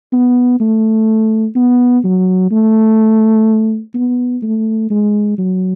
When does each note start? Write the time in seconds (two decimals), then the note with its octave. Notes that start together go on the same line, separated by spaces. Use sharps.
0.13 B3
0.60 A3
1.56 B3
2.04 F#3
2.51 A3
3.94 B3
4.42 A3
4.90 G#3
5.38 F#3